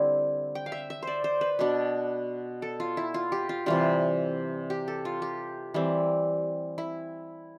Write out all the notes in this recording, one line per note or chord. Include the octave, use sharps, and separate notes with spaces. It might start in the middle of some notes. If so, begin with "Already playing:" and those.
Already playing: D3 G3 C4 E4
G5
F5
E5
E5
C5 D5
C5
B4
B2 B3 D4
A4
F4
E4
F4
G4
F4
C3 E3 G3 F4
G4
A4
F4
G4
E3 G3 C4
E4